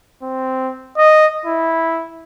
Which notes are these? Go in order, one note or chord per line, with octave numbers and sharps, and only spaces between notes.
C4
D#5
E4